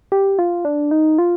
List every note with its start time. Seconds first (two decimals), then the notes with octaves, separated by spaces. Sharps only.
0.12 G4
0.39 F4
0.65 D4
0.91 D#4
1.18 F4